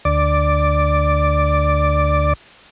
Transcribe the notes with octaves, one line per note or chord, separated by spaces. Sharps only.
D2 D5